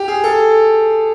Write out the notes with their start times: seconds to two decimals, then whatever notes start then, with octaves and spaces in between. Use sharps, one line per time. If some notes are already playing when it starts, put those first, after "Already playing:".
Already playing: G4
0.08 G#4
0.24 A4